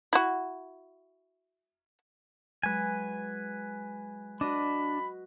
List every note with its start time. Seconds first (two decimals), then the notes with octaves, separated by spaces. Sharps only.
0.13 E4 F#4
2.63 F#3 G#3 B4 G#5
4.41 D4 F#4 B4 D#5 B5